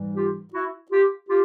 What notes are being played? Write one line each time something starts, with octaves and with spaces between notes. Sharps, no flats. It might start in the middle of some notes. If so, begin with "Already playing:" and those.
Already playing: G#2 E3 G3
F4 G4
E4 F#4
F4 G4
F4 G4